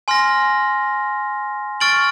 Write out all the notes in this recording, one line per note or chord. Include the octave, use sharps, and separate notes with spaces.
G#5 C6 F6 A#6
C#6 F6 A6 D7 F#7